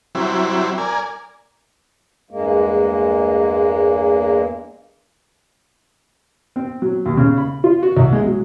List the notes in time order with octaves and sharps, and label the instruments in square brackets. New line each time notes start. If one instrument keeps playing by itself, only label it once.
[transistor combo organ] F#3 G3 C4 E4
A#4 D5 G#5
[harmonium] E2 G2 G#3 A#3
[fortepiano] C4
F#3
D#2
C#3
B5
F4
F#4
C2
G#3
F#3